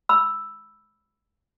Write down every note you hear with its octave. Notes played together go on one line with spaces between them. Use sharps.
B5 E6